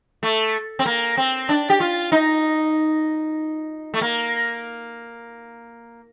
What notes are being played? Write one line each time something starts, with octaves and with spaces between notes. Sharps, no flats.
A3
C4
A#3
C4
D4
G4
F4
D#4
A3
A#3